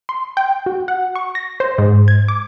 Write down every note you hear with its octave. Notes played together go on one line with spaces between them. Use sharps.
C6
G5
F#4
F#5
C#6
A#6
C5
G#2
G#6
D6